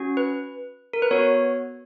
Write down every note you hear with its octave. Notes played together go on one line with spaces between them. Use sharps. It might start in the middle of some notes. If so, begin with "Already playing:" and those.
Already playing: C#4 F#4
B4
A#4
B4
B3 F#4 C#5